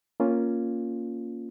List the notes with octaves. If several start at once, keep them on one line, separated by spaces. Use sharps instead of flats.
A#3 C#4 F4